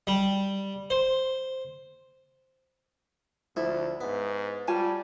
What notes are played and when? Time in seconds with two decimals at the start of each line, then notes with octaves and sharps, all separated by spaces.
0.07 G3
0.90 C5
3.56 D2 F3 E4 A4
4.01 G#2 B3
4.68 G3 F4 C#5 G#5 A5